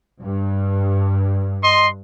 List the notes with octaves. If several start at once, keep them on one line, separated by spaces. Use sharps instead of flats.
G2
D#5 C6